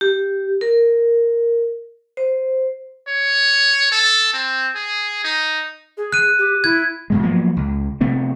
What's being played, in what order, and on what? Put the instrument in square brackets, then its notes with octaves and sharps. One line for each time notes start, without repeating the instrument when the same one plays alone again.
[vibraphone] G4
A#4
C5
[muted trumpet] C#5
A4
C4
G#4
D#4
[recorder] G#4
[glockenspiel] F#6 D#7
[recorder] G4
[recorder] E4 [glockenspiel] G#6
[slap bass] G#2 B2 G#3
F3 F#3 A#3 B3
C#2
C3 A3 B3 C4